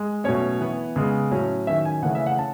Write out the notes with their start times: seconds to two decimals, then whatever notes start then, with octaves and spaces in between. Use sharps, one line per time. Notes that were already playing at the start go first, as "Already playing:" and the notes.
Already playing: G#3
0.24 B2 F#3 A3 C#4 C#5
0.60 E3 B3
0.96 C#3 G#3 B3
1.31 A2 F#3 C#4
1.67 D#3 F#3 C#4 E5
1.85 G#5
2.02 C#3 E3 A3 C#4 F#5
2.15 E5
2.26 F#5
2.38 C#4 A5